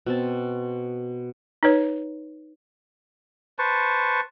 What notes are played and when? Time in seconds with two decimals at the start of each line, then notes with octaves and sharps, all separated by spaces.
0.06 B2 C4 A5
1.63 D#4 B4 C#5
3.59 B4 C5 A5 C#6